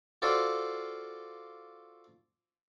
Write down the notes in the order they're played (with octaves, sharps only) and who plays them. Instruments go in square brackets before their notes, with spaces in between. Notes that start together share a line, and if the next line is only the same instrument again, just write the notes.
[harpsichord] F4 F#4 A4 C5 D5